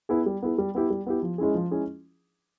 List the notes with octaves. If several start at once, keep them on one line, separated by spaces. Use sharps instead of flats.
B3 E4 G#4
G3
B3 E4 G#4
G3
B3 E4 G4
G3
B3 E4 G4
F3
G#3 C#4 E4 G#4
F3
G#3 C#4 E4 G#4